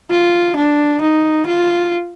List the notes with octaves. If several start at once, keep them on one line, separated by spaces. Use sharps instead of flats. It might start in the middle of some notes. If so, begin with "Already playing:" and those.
F4
D4
D#4
F4